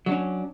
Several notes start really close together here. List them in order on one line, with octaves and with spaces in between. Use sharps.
F#3 D4 C#4